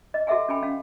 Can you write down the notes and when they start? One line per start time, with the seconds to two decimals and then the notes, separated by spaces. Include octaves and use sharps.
0.14 D#5
0.27 F#4 A4 D#5 E5 F#5 G#5
0.48 C#4 A4 G5 G#5 B5
0.63 C#4 F5